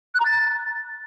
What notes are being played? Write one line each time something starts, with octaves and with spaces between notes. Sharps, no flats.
F#6
A#5
A6